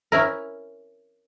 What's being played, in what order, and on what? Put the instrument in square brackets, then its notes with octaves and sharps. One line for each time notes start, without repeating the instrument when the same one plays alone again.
[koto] C#4 E4 A#4